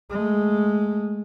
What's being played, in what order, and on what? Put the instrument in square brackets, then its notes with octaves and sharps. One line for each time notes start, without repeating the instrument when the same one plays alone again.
[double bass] G#3 A3